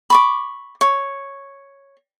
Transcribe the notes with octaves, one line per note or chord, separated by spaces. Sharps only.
B5 C#6 D6
C#5